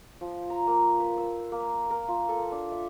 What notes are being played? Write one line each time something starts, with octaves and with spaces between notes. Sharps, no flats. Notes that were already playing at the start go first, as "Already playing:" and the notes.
F3
A#5
A#3
B4
E6
A#3
A#4
F4
A4
D4
E5